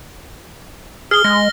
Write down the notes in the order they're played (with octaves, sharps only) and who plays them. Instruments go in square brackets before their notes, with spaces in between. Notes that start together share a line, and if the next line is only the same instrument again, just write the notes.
[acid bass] G#4 [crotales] F6 G7
[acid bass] G#3 [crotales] A#6